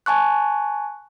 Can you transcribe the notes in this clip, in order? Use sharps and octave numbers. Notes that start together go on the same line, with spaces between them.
G#5 A5 C#6 F#6